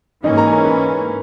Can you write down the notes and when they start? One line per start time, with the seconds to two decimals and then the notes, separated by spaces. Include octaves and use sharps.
0.23 G#2 E3 A#3 C#4 D#4 D#5
0.37 A#4 A#5
0.47 G#5
0.52 A#4 A#5
0.65 B4 B5